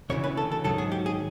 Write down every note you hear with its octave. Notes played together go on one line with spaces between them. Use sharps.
D2 C#3 E3 C#5
B4
A4
A4
G#2 D#3 F#3 A4
G#4
G4
G#4